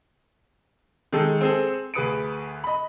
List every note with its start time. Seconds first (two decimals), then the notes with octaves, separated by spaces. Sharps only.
1.13 D#3 G#3 G#4 A4
1.41 C4 G#4 A4
1.94 D2 G#4 B4 D#6 C#7 D7
2.64 D#5 B5